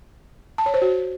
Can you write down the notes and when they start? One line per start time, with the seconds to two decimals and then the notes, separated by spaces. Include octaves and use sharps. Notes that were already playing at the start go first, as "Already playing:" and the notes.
0.58 A5
0.66 C#5
0.74 C5
0.82 F#4